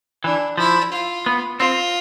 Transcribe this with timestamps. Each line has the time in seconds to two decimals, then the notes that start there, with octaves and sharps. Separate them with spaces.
0.24 E3 D4
0.58 F3 E4
0.92 F4
1.26 B3
1.59 C4 F4